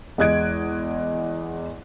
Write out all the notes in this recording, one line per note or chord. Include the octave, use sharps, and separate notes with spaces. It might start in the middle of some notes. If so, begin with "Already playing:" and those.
E2 G#3 D#5 F#6 G#6 D7